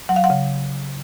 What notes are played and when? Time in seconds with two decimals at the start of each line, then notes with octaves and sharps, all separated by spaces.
0.09 F#3 F#5
0.16 F5
0.24 F#5
0.30 C#3